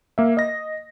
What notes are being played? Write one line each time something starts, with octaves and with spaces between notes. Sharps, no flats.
A#3 E5
D#5 A#6